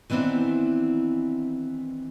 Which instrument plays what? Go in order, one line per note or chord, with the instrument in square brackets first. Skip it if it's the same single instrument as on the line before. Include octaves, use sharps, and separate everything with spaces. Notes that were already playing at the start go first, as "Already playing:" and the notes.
[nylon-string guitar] D#3 E3 B3 C4 D4 E4